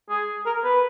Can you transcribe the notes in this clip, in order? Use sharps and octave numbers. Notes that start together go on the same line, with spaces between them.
G#4
A#4
B4